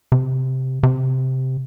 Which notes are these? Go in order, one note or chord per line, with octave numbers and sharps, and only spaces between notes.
C3
C3